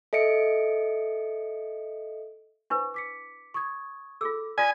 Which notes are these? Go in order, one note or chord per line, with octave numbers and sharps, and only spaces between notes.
A4 D#5 E5 C#7 D7
D4 E4 B4 C5 C#6
D6 B6 C#7
C#6 D#6 G#6
F4 G#4 A4 D6 E6
F4 D5 G#5 D#6 F6 B6